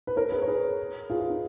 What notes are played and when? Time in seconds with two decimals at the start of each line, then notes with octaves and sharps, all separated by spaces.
0.07 B4
0.16 A#4 C#5
0.32 G#4 B4
0.42 C#5
0.48 G#4 B4
1.10 F4 G#4
1.20 F4
1.30 D#4